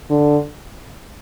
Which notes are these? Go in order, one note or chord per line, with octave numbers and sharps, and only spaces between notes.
D3